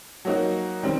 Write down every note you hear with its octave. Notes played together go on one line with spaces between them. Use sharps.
F#3 A#3 D#4 F#4
D#3 G3 C4